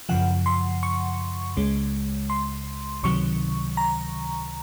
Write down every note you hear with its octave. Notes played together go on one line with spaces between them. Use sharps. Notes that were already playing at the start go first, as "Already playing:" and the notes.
F#2 C#3 F3 F#5
C6
C#6
C#2 C#3 G#3
C6
C#2 C3 D#3 F#3 C#6
A#5